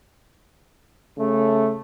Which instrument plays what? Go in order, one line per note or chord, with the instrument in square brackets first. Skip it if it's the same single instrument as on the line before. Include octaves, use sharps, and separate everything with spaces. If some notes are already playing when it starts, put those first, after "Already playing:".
[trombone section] C#3 A3